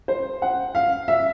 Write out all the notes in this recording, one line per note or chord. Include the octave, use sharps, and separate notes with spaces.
C5
F#5
F5
E5